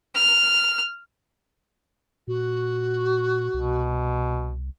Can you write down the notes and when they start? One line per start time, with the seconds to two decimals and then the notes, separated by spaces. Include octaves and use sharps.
0.15 F6
2.27 A#2 F#4
3.54 C2 B2